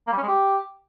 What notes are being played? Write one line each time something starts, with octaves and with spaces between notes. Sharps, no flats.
A#3
G3
C#4
G#3
G4